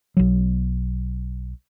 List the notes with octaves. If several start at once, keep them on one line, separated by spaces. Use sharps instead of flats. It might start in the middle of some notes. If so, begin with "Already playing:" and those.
B1 F#3